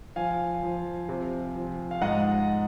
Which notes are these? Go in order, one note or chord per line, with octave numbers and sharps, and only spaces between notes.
F3 F5 G#5
F3
C3
F3
F5
G#2 D#5 F#5